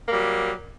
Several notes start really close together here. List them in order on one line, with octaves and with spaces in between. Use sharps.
A#3 G3 F#3